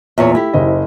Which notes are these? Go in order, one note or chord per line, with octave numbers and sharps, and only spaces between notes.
E2 A#2 C#5
A3 E4 G4
F#1 C5 D#5